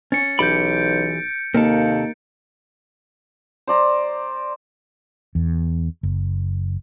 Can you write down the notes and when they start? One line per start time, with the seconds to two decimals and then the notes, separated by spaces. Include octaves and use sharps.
0.12 C#4 A6 C#7
0.39 B1 E3 G4 B5 G6 D7
1.54 D#2 C3 A#3 A4
3.68 C5 D5 A#5
5.35 E2
6.03 F#1